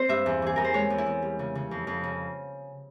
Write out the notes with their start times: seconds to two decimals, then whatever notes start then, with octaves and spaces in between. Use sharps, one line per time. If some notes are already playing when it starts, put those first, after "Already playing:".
Already playing: C4 C5
0.09 G2 E5
0.26 E2
0.42 E3 G#4
0.56 E2 A#4
0.64 C5
0.74 G#3 C#5
0.90 E2
0.98 E4
1.06 E2
1.22 G3
1.39 C#3
1.55 C#3
1.71 F2
1.87 F2
2.03 C#3